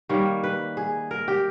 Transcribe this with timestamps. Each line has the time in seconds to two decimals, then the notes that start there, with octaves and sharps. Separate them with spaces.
0.09 D#3 G3 A#3 C#5
0.44 B4
0.77 G#4
1.11 A#4
1.28 G4